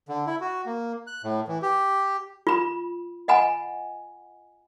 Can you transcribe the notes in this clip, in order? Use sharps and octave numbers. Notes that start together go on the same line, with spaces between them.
D3
E4
F#4
A#3
F#6
A2
E3
G4
F4 B5
D#5 F#5 G#5 B5